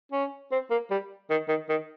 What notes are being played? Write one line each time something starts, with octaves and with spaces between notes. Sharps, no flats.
C#4
C4
A#3
G3
D#3
D#3
D#3